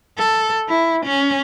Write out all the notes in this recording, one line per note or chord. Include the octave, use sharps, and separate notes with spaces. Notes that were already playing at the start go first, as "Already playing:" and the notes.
A4
E4
C#4